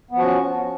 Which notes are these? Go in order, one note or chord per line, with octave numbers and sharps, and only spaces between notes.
F3 B3 C#4 F#4